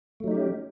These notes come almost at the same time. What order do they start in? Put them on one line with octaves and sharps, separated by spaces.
A3 F#3 D#4 G4 C#4